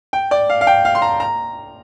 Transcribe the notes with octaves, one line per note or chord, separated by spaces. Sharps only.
G5
D5
F5
F5
G5
F5
C6
A#5
A#5